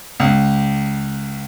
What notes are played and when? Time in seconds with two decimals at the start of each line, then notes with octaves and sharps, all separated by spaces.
0.20 C#2